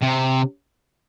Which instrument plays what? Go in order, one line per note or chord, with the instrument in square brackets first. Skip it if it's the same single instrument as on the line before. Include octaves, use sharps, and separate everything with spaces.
[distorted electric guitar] C3